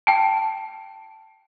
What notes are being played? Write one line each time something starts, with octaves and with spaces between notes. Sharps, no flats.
G5 A5